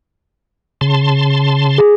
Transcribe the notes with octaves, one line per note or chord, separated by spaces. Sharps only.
C#3 A5 C6
G#4